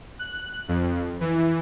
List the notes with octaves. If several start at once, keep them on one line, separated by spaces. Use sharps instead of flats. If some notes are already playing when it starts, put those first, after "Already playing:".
F#6
F2
E3